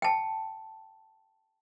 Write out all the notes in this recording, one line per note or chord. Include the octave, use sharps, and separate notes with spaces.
G5 A5